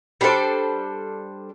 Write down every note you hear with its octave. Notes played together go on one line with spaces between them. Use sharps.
G3 D4 A4 C5